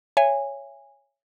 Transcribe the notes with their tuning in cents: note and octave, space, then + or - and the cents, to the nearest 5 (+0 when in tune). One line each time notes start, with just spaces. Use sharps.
C#5 +0 E5 +30 G#5 -15